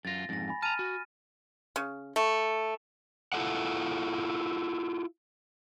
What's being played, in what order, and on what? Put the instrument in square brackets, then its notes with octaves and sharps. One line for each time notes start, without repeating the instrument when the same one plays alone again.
[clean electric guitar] F#2 F4 [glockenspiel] A6 A#6
[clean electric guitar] F2 G#2 [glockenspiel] A6 A#6
[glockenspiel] G#5 B5
[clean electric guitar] A5 A#5 [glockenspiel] F6 A6 D#7
[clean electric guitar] F#4
[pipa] C#3
A3
[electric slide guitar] E4 F4 A4 D#5 F#5